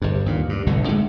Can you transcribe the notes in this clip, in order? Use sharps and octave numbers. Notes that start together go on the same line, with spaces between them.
G1 G2
D#2 A#2
G2
G1 C2 A2 D3
D3 G#3 A3